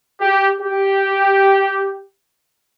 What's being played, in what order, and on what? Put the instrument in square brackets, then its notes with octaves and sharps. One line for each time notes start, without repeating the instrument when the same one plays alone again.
[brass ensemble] G4
G4